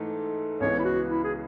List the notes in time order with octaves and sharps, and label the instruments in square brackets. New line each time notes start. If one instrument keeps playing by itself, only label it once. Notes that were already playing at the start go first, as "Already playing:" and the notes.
Already playing: [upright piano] G#2 E3 A3 D#4
[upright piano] C#2 C#3 E3 B3 [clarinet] C#5
[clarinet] E4
F#4
E4
G#4